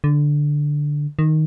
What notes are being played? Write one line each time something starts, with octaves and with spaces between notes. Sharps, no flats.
D3
D#3